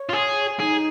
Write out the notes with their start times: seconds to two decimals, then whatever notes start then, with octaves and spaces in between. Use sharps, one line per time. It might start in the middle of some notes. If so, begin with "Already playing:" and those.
Already playing: C#5
0.09 F4
0.13 G#4
0.60 D#4 G#4